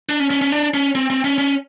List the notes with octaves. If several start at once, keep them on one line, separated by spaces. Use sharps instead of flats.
D4
C#4
C#4
C#4
D4
C#4
C4
C4
C#4
C#4